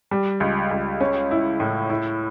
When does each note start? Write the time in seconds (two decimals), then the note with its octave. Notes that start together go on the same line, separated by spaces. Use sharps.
0.11 G3
0.40 C#2
0.71 C#2
1.00 C#4
1.31 E4
1.60 A2
1.90 E4